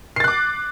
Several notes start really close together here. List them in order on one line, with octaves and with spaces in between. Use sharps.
C7 A6 F#6 D6